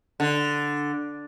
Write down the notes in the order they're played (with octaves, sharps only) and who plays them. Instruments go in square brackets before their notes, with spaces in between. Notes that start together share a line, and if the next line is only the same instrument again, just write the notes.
[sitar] D3